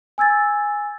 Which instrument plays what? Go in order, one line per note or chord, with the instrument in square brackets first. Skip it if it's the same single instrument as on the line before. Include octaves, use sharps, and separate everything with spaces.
[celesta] G#5 E6 G#6 A6